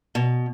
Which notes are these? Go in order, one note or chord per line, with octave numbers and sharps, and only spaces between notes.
B2